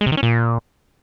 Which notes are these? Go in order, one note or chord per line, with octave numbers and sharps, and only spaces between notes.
G#3
C3
D#3
C#4
A#2